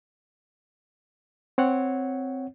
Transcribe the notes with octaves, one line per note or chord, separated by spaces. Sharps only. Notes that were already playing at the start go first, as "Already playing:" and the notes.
C4 C#5 F#5